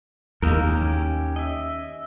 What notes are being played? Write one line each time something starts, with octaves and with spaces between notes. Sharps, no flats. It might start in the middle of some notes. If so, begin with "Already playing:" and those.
D#2 G#3 A#3 A#4
C#4 G4
D#5 E5